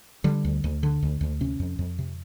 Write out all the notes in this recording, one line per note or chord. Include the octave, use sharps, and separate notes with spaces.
D3 G3
D2
D2
D3
D2
D2
C3 C#4
F2
F2
C3